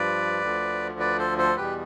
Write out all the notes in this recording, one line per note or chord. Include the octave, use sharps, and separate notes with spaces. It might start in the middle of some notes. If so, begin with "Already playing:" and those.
Already playing: G2 F3 B4 D5
D2 D3 F3
B4 D5
A4 C5
A4 C5
E2 B2 G3 G4 B4